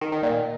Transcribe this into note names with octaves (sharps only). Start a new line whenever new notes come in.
D#3
D#3
A#2